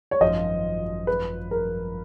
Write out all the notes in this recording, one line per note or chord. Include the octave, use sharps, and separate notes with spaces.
C#5
G#1 F#2 F3 D#5
B4
A#4